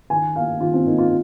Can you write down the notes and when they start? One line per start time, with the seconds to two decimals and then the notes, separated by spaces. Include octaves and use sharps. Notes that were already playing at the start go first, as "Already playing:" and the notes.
0.10 D#3 G#5
0.36 A#3 F5
0.60 D#3 F4
0.74 C4
0.86 A#3 D#4
0.98 F4